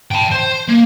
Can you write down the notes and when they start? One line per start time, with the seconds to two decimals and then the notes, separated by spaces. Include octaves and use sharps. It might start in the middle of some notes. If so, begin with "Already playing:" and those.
0.12 G5 A5
0.32 C5
0.68 A#3